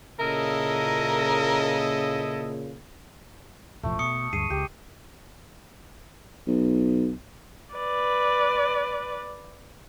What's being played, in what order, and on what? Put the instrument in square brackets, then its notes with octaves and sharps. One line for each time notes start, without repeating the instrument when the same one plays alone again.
[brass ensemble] A#2 C#3 [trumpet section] E4 A4 D#5 [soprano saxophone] A#4
[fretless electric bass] E1 A1 F3 [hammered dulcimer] A3
[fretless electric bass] B2 [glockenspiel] C#6 D#6 C#7
[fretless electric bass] D2 G2 [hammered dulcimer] G#4 [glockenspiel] C7 D#7
[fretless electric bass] C#2 [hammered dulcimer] G4
[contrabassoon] B1
[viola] B4 D5